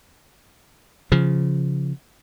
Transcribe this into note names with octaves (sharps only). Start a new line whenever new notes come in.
C#3 F3